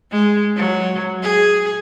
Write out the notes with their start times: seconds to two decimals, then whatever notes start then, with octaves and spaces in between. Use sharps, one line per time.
0.12 G#3
0.56 F#3
1.23 G#4